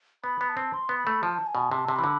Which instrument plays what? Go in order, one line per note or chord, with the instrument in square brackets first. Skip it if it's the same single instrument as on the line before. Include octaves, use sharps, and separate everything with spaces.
[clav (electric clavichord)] B3 [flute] B5
[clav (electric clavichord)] B3
[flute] A5
[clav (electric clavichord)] C4
[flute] C6
[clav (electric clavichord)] B3
[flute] B5
[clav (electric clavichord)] A3
[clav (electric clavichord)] F3 [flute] A5
[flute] G#5
[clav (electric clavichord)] B2
[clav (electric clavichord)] C3 [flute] A5
[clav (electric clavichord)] C3
[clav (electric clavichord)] E3 [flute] B5
[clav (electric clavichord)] D3